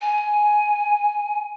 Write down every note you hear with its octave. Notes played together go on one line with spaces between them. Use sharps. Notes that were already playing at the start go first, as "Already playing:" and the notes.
G#5